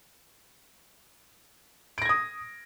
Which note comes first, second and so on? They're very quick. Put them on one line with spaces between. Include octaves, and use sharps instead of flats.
D7 A#6 G#6 D#6